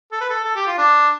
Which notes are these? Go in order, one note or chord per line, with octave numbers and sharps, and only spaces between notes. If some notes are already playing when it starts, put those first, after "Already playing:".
A4
B4
A4
A4
G4
F4
D4